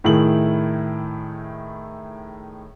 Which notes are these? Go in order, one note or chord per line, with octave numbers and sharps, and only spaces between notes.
A2 D#3 E4 G#4 F#7